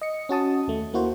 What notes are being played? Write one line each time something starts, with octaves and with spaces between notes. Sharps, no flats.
D#5 C#7
C#4 F#4 A5 D#6
D#2 A3
A#3 E4 F#4 C5